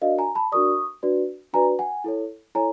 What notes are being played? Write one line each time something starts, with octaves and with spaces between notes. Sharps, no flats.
D4 F#4 A#4 D5 D#5 F5
G#5 A#5
A5 B5
D4 F#4 A#4 D5 C#6 D#6
D4 F#4 B4 D5
D4 F#4 B4 D5 G#5 A#5
F#5 G#5
E4 A4 C#5
E4 A4 C#5 G#5 A#5